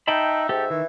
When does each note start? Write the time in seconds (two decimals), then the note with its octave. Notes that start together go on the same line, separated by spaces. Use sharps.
0.08 D#4 E5 G5 A5 B5
0.49 G#2 G4 A4
0.70 D#3 E3